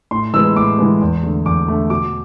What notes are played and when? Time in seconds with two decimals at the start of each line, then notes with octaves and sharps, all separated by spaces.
0.11 A2 C6
0.34 E3 G#3 B3 E6
0.56 A2 D6
0.78 E3 G#3 B3
1.01 E2
1.23 D3 A3
1.45 E2 D6
1.68 D3 A3
1.90 B2 D6